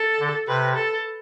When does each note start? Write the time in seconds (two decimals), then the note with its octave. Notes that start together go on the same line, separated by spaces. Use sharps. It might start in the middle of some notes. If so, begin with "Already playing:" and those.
Already playing: A4
0.20 D3
0.48 C3 B4
0.76 A4